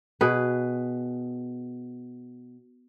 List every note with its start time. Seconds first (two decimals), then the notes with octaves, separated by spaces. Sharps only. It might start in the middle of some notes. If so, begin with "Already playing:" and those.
0.21 B2 G#4 B4